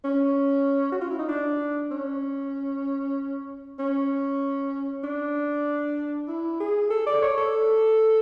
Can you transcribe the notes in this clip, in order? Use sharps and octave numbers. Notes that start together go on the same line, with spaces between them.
C#4
F#4
F4
E4
D#4
D4
C#4
C#4
D4
E4
G#4
A4
D5
C#5
A4